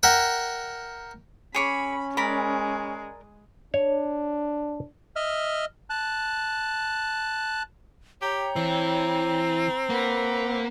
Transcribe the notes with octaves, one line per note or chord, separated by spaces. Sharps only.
A#4 E5 F#5 G5
C#4 G#4 C#5 B5 D6
G#3 A#4 D5 B5
D4 C#5
D#5 E5 F6
A5 F#6
G4 C#5 G5 A#5
E3 C4
A#3 B4 F#5